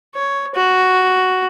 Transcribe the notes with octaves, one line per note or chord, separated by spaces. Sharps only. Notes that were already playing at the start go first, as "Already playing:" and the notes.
C#5
F#4